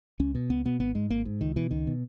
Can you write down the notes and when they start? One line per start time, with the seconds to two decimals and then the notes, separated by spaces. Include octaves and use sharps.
0.20 C#2 C#4
0.35 B2
0.50 C#2 B3
0.65 B2 B3
0.80 G#1 B3
0.95 G#2 G#3
1.10 G#1 A#3
1.25 G#2
1.41 C#2 D#3
1.56 B2 E3
1.71 C#2 D#3
1.87 B2